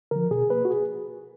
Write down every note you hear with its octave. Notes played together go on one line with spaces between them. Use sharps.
D3 F3 A#4
B2 G#4
A#3 B4
F#4
G#4